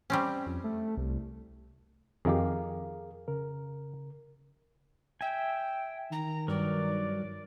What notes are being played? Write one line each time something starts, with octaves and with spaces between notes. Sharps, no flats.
G3 C4 C#4
F2
A3
C2
F2 D#3 G4 G#4 A#4 F5
C#3 A#4
E5 G5 G#5
D#3 A#5
G2 F#3 A#4 D5